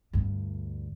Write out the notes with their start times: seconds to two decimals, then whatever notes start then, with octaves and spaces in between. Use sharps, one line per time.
0.13 D2 G2